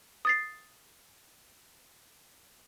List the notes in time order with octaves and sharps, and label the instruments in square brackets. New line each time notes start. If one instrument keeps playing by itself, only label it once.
[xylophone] D#6 A6 C7